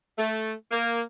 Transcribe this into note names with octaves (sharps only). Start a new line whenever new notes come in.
A3
A#3